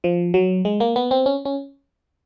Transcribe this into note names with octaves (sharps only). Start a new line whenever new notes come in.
F3
F#3
G#3
A#3
B3
C4
C#4
C#4